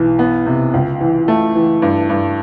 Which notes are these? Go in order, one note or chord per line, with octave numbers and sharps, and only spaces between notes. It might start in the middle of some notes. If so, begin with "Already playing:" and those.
Already playing: B1 E3
B3
C3
C#2
E3
A3
E3
G2
G2